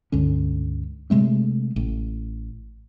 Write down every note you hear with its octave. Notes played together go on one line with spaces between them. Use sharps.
C#2 G2 D3 C#4
C3 G#3 A3 C4
A1